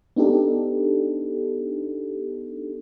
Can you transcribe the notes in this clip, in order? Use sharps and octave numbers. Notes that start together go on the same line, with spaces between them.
B3 D4 D#4 G4 A4